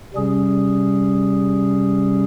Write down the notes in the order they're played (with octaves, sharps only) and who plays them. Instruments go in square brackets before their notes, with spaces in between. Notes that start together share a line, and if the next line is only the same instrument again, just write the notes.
[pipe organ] C3 G3 C#4 G#4